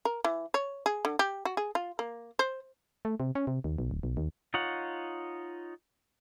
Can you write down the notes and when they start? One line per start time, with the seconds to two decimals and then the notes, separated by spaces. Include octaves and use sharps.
0.05 A#4
0.25 E3
0.54 C#5
0.86 G#4
1.05 D3
1.19 G4
1.45 F#4
1.57 G#4
1.75 F4
1.99 A#3
2.39 C5
3.05 A3
3.20 C3
3.35 C#4
3.47 C3
3.64 D#2
3.78 B1
3.91 D1
4.03 B1
4.17 D#2
4.54 D#4 F4 C#5 F#5